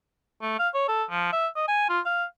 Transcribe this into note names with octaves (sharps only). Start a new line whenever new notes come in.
A3
F5
C#5
A4
F3
E5
D#5
G#5
F4
F5